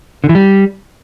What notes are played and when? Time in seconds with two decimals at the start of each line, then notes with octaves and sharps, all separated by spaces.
0.24 D3
0.29 E3
0.35 G3